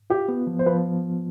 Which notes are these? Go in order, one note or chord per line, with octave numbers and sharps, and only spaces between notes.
F4 G4
B3
F3
C5
F3 B4